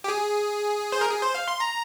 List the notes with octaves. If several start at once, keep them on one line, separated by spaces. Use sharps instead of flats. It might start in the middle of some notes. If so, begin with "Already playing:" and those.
G4
G#4
C5
A#4
G#4
C5
F5
C6
A#5